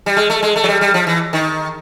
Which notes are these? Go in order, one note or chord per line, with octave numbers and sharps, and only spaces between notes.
G3
G#3
A3
G#3
A3
F#3
G3
G3
F3
E3
D#3